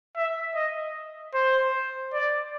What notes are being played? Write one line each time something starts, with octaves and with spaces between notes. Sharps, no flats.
E5
D#5
C5
D5